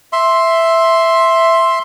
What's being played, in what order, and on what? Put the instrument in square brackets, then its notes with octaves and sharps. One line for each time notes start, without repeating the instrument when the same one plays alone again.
[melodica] E5 C6